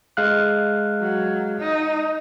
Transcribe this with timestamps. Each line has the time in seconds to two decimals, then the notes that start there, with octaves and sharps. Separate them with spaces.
0.17 G#3 F5 F#6
1.01 F#3
1.59 D#4